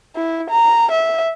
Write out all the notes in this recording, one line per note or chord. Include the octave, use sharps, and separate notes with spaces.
E4
A#5
E5